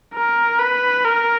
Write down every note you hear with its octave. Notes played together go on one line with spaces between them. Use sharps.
A#4
B4
A#4